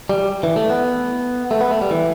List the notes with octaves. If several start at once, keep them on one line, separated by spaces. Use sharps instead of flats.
G3
E3
A3
B3
A3
B3
A3
G3
E3